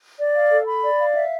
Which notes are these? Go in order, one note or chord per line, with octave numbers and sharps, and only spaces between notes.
D5
F5
A4
B5
D5
F5
E5